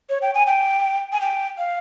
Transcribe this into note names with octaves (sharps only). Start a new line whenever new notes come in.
C#5
G5
G#5
G5
G#5
G5
F5